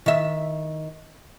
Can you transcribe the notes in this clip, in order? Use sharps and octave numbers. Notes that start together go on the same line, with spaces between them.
D#3 E5